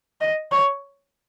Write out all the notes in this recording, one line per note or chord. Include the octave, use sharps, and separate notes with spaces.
D#5
C#5